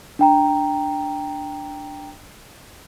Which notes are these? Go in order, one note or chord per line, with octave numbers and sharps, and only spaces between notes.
D4 G5 A#5